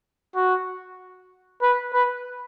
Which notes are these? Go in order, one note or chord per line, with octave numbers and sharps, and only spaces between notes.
F#4
B4
B4